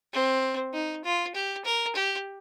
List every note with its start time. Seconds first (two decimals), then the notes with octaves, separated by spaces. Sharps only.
0.13 C4
0.73 D#4
1.05 F4
1.35 G4
1.65 A#4
1.95 G4